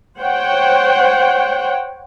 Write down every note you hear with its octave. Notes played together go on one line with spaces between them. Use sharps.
C5 C#5 F#5 G5